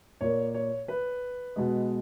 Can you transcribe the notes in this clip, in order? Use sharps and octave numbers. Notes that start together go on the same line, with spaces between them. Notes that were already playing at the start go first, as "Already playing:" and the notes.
A#2 A#3 C#5
C#5
B4
B2 G#3